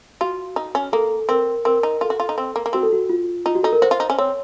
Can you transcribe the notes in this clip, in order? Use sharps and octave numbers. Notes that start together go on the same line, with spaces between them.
F4 F#4
D#4
C#4
A#3 A4
C4 A#4
C4 A#4
D#4
F4 A4
F#4
F4
D#4
C4
A#3
A#3
C4 F#4
A4
F#4
F4
D#4 F4
F#4
D#4 A4
A#4
F#4 C5
F4
D#4
C#4
C4 C#5